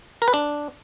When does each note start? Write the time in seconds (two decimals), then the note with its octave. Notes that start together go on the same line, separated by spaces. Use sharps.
0.22 A#4
0.28 B4
0.34 D4